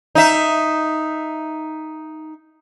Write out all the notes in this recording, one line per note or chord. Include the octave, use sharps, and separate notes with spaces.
D#4 E5